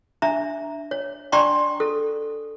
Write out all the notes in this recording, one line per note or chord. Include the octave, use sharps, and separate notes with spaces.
D4 E5 A#5
C#5
D4 D5 G5 A#5 C6 C#6
A4